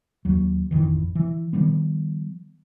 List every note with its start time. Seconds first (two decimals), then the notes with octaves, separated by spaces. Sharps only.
0.25 D#2 F#3
0.71 A1 F2 D#3 E3
1.15 E3
1.53 D#3 F3 G3 B3